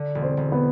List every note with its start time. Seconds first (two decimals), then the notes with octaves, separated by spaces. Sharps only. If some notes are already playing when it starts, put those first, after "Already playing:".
Already playing: D3
0.15 E1
0.22 C4 C5
0.37 E1
0.52 B3 B4